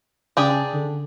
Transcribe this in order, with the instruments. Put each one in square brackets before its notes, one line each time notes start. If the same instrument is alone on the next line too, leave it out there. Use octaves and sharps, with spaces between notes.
[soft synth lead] C#3 [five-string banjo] D4 G4 G#4
[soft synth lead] D3